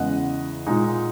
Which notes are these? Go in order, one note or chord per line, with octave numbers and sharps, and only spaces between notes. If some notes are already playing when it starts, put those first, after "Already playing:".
Already playing: E2 C#3 G#3 D#5 F#5
A#2 G#3 D#4